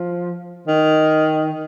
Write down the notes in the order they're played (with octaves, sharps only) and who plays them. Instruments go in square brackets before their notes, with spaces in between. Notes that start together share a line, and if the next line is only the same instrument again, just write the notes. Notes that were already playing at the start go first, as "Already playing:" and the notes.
Already playing: [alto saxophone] F3
D#3